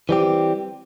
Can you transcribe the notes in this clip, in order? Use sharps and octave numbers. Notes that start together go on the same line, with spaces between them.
E3 G3 C4 G4